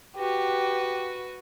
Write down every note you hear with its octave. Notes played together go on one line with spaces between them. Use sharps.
F#4 G4 B4